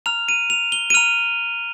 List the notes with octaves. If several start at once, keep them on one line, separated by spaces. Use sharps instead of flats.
A#5 F6 F7
D#7
F7
G7
D#7
A#5 F6 F7